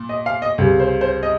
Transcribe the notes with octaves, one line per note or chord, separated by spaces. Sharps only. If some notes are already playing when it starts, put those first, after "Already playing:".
Already playing: A#2
D#5
F5
D#5
C#2 C3 G3
C5
C5
D#5